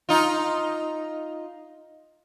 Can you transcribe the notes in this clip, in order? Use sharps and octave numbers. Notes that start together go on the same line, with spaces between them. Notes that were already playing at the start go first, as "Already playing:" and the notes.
D#4 F4